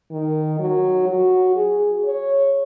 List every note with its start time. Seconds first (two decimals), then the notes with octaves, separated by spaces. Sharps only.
0.11 D#3
0.60 F#3
1.09 F#4
1.56 G#4
2.05 C#5